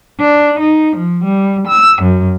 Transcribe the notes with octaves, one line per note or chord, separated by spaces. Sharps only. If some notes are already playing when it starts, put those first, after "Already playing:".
D4
D#4
F3
G3
E6
F#2